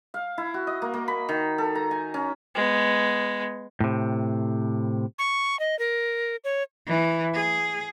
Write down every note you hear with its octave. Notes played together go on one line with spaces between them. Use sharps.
F5
E4
F#4
D#5
A#3
A#3
B5
D#3
A4
A#5
G#5
C#4
G#3 B3
A2 C3
C#6
D#5
A#4
C#5
E3
G#4